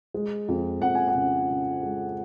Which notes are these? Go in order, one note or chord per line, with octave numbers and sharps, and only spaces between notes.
G#3
F2
F2 F#5
G#5
F#5
C#3
C#3
G#3